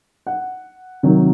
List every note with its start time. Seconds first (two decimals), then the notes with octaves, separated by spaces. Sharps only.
0.27 F#5
1.03 C3 D#3 F#3